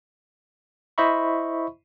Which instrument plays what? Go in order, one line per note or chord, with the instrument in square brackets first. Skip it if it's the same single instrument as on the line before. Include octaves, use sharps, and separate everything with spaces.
[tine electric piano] E4 C5 D#5 E5 B5 C#6